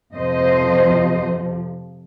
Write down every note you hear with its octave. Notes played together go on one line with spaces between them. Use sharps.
F2 C3 F3 C5 D#5